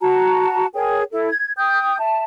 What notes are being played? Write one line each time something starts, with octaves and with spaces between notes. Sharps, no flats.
F#4 A5 A#5
G#4 A#4 C#5 G5
E4 A4
G#6
G5 D#6 G6
E5 A5